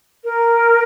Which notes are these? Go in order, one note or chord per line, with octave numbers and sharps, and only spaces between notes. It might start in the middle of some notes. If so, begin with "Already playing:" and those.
A#4